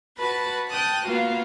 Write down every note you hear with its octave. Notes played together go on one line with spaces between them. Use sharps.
F#4 B4 A5 B5
G5 A5 D#6 F#6
A#3 B3 F4 F#4 F5